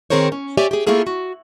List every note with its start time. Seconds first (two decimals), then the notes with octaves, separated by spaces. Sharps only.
0.10 D#3 C4 G#4 A#4 C5 C#5
0.32 C#4
0.57 G4 C#5 D5 E5 G#5
0.71 G4 G#4
0.87 A3 A#3 E4 F4 G#4 A4
1.07 F#4